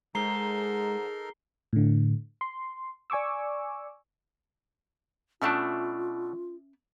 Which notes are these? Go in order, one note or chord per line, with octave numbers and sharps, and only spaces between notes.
G#2 G#3 D#4 A4 A#4 A#5 C7 G7
A2 D3
C6
D5 G#5 C#6 D6 E6
B2 A3 C#4 D4 F4 E5 A5